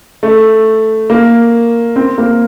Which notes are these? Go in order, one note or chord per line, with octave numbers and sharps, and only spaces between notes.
A3
A#3
C4
A#3